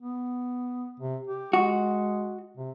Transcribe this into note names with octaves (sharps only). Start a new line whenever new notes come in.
B3
C3
G4
G#3 F#4
C3